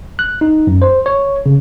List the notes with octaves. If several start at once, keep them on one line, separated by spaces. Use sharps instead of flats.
F#6
D#4
F#2
C5
C#5
C#3